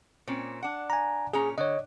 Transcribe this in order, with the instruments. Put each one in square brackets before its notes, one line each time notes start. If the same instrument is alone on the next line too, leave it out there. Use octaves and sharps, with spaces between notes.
[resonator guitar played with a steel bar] A#2 C4 C#4
D4 F#5
[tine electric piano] G#5 A#5
[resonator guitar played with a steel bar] A#2 C#4 A#5 [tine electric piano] G#4
[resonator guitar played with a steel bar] D3 [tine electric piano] C#5 D#5